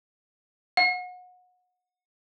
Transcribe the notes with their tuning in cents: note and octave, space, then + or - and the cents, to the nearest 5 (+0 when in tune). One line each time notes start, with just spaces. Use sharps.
F#5 -30